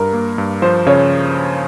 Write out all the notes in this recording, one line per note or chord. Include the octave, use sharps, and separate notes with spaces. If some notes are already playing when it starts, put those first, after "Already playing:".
Already playing: G2 A#4
A#3
G2
F3 C5
C#3 C#5